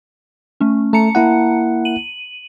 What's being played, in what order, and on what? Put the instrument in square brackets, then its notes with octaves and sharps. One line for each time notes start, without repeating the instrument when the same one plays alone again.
[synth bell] A3 C#4
[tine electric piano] A3 [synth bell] A5 A#5 C#7
[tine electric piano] A#3 E4 F#5
[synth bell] D#7 F#7